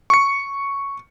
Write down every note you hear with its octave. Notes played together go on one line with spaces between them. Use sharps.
C#6 C#7